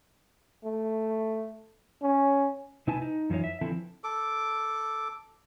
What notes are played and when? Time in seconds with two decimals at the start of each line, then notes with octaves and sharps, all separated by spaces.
0.64 A3
2.02 C#4
2.87 C3 D#4 E4 B4 G#5 A5
3.02 D#4
3.30 F#2 E3 F3 D#4 C#5
3.44 E5
3.61 D3 E3 F3 C4 E4 A4
4.04 A4 D6